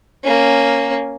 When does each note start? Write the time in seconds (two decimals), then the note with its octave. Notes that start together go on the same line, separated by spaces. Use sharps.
0.23 A#3 C#4